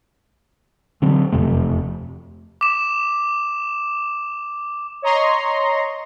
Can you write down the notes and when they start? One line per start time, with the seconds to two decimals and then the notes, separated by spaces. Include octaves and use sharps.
1.02 D3 F#3 C4
1.32 E1 F2 C3 A3
2.61 D6 E7
5.02 C#5 D#5 A#5 C6 C#6